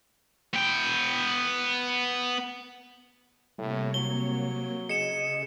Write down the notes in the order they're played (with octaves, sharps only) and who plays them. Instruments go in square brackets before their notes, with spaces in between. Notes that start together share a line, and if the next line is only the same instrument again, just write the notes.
[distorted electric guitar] B3 G5
[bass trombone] A2 [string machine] C3 A#3 C#5 [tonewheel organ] G3
[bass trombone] F#3 [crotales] G7
[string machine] C#3 [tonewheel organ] G#4 D#5 [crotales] C#7 E7